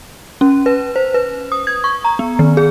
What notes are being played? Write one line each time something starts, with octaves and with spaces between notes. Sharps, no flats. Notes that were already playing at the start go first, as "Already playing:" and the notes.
C#4
B4
C5
B4
D#6
G#6
C#6
A#5
B3
D#3
G#4